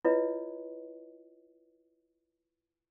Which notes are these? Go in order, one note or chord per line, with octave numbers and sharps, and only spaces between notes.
E4 F4 B4 C#5 D#5